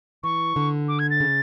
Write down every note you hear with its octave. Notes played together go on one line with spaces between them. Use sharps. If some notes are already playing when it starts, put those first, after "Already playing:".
E3 C#6
D3
D6
G#6
A6
C#3